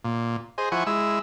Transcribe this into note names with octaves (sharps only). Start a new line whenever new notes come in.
A#2
G#4 C5 D#5
F3 E4 F#5 G#5 C#6
G#3 E4 E6